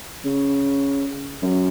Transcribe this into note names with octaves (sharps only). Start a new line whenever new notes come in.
C#3
F#2